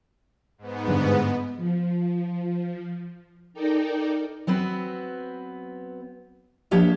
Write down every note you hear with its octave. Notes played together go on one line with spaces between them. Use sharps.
G#2 B3
G2 D3
F3
D#4 A4 A#4 D5 G5
F#3 B3 C4 B4
F3 A#3 D4 G4 C#5 E5